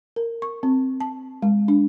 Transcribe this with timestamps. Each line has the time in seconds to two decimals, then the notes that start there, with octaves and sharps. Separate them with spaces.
0.16 A#4
0.42 C#6
0.63 C4
1.00 A5
1.42 G#3
1.68 D4